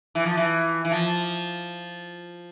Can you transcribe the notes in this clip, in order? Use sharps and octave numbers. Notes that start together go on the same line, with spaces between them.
E3
F3
E3
E3
F3